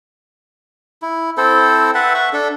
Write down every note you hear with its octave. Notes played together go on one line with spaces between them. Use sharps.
E4
C4 E4 A4 C5
B4 E5 F#5 A5
E5 F#5 C#6
D4 A4